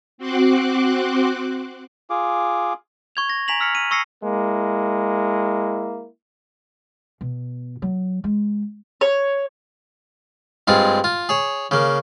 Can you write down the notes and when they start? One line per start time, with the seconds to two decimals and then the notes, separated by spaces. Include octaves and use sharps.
0.18 C4 F#4 C6 D6 F#6
2.10 F4 G#4 D6
3.16 C#6 G#6 F7
3.29 A#6
3.48 G#5 A#5 B6 F7 F#7
3.60 E6 F6 B6 C#7 F7
3.75 D#7
3.90 A#5 C#6 E6 A#6 C7 C#7
4.24 G#3 A#3 E4
7.21 B2
7.82 F#3
8.24 G#3
9.01 C#5
10.68 G2 G#3 C4 F4
11.04 F4
11.29 G#4 C#5
11.71 C#3 A#3